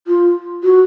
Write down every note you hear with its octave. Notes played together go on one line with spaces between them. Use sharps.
F4
F#4